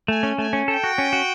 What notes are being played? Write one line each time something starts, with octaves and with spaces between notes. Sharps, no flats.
A3 G#5
C#4
A3 G#5
C#4
A4 G5
F#4
C#4
F#4